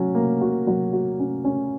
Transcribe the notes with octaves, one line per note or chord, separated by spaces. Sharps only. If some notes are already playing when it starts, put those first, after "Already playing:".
Already playing: F#3 C#4
A#3
F#4
F#3
F#4
C#4
C#4